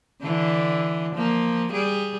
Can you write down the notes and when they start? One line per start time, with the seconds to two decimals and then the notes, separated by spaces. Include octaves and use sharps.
0.23 D3 E3 D4
1.15 F3 A#3
1.72 G3 G#4